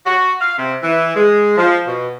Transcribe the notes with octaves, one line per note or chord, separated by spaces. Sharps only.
F#4
F5
C3
E3
G#3
F3
B2